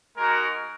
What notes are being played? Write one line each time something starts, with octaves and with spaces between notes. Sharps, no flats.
G#3 D#4 F#4 A#4